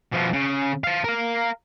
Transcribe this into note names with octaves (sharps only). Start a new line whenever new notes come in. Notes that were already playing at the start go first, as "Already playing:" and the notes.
B2 F3
C#3
F5 A5
A#4 F5